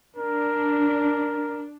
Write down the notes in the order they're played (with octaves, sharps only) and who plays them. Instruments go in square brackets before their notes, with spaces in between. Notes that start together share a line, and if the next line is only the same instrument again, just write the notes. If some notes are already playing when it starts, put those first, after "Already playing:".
[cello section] D4 [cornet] A#4